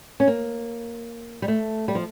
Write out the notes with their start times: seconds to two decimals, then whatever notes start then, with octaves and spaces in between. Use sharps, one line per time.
0.20 C#4
0.27 A#3
1.42 G3
1.48 A3
1.88 G3
1.95 F3